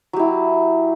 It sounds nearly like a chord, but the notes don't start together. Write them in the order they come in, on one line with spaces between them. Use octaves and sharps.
F#3 G4 E4